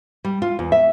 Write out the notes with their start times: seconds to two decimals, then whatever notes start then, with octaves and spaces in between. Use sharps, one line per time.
0.25 G3
0.42 F4
0.59 E2
0.72 E5